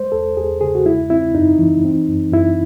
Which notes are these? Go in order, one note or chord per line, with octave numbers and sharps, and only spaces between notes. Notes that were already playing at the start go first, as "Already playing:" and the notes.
Already playing: G#3 C5
E2 A4
E2 G#4
C#3 G#4
F#4
G#3 E4
C4 E4
F#2 D#4
E3
C4
F#2
F#2 E4